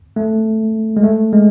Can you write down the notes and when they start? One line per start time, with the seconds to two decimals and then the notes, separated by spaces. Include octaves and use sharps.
0.16 A3
0.97 G#3
1.03 A3
1.33 G#3